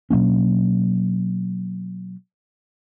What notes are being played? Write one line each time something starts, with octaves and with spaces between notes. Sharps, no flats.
B2 F#3 A#3 C#4